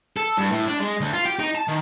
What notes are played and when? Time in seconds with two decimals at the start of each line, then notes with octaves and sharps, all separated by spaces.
0.17 A4
0.37 G2
0.50 A2
0.67 D4
0.80 G#3
1.00 D2
1.13 F4
1.25 G4
1.39 D#4
1.55 A5
1.68 D#3